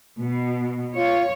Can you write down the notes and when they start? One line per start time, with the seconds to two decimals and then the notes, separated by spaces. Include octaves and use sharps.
0.19 B2
0.96 F4 C#5